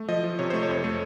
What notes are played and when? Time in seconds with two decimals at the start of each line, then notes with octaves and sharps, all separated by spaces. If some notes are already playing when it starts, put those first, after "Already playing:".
Already playing: A3
0.09 F3 D#5
0.24 F3
0.39 C3 C#5
0.50 A3 C5
0.63 C#5
0.69 F2
0.84 A3